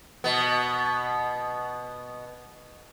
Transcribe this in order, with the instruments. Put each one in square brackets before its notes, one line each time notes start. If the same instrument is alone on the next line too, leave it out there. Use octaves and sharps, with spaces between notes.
[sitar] B2 B3